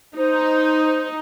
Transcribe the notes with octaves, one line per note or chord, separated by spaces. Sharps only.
D#4 C5